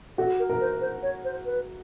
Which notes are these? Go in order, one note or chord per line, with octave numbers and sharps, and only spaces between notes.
F#4 A4
A#4
A#4
C5
C5
C#5
C5
B4